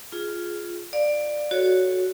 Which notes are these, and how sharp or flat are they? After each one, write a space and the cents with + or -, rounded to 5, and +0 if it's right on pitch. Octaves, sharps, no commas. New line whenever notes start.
F4 +0 G#4 +10
D5 +15 F5 +10
F#4 +0 A4 -20 C#5 +0